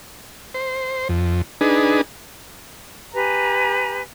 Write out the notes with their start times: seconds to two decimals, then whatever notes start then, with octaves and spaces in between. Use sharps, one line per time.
0.54 C5
1.09 F2
1.61 D4 D#4 G#4 B4
3.13 G4 B4 G#5 A#5